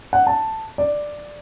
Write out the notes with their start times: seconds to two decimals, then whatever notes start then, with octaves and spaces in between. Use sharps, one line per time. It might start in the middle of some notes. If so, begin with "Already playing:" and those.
0.13 F#5
0.27 A5
0.78 D5